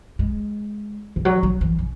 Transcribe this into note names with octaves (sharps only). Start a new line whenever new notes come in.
G#3
E3
F#3
F#3
E3
C#4